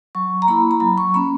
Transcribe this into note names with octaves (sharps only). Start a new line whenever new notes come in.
F#3 C#6
A#5
A#3 E4 B5
A#5
F#3 B5
C#6
A#3 C#4 B5